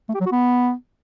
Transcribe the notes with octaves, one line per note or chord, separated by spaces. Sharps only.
A3
G4
F#3
F#4
B3